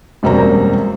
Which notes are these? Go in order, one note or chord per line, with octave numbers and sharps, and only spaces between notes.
E1 F#2 G3 A#3 C4 A#5